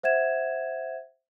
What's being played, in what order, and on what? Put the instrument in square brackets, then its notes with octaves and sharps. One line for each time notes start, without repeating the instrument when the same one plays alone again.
[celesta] C5 E5 F#5 G#6 E7